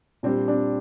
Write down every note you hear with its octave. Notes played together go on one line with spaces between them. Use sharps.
A#2 G3 C4 D4
C4 D4